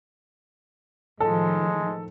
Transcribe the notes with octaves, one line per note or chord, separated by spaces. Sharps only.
A2 D#3 F3 G#3 A4